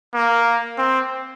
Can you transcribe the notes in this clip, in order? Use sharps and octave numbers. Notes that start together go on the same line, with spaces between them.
A#3
C4